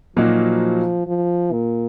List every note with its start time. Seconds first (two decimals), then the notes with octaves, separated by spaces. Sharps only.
0.16 A#2 F3 F#3 A#3 D#4 F#4
1.07 F3
1.52 A#2